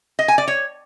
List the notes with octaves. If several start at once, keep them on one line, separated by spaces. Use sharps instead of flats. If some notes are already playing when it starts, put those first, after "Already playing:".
D#5
G#5
D5
C#5